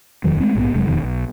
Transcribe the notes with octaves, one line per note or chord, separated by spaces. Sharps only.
D#1 F2 D#3 F#3
G#3 A3 C4
A#1 G#2 F3 B3
F1 C3 F#3 G#3
E1 F2 B2 D#3
B1